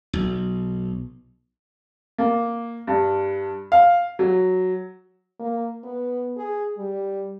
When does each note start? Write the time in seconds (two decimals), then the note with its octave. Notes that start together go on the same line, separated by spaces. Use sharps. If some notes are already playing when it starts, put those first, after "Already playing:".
0.13 B1
2.18 A#3
2.87 G2
3.72 F5
4.19 F#3
5.40 A#3
5.84 B3
6.37 G#4
6.78 G3